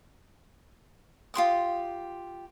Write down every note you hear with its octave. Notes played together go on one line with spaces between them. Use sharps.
F4 G4 C6 D#6